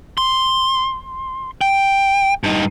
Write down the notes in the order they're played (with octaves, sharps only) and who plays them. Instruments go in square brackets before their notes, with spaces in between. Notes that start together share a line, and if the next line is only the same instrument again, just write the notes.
[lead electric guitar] C6
G5
G2 D#4